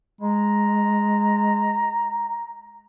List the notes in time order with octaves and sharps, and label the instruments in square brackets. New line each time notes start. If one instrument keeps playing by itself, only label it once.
[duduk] G#3 [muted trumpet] A#5